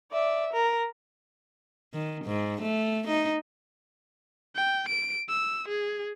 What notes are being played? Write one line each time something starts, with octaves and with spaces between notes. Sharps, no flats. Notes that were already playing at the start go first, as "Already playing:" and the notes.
D5 E5
A#4
D#3
G#2
A3
D#4
G5
D7
E6
G#4